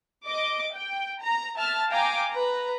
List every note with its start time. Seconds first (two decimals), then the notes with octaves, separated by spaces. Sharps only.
0.27 D#5 D6
0.73 G5
1.21 A#5
1.56 E5 A5 F6
1.89 F5 G5 G#5 A#5 D6
2.30 B4 A#5